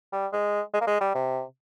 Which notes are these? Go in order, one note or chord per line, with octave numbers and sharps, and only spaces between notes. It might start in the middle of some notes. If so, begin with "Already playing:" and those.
G3
G#3
G#3
A#3
G#3
G3
C3